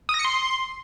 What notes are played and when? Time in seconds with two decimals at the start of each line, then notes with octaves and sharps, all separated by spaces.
0.09 D#6
0.14 A#6
0.19 C#7
0.25 C6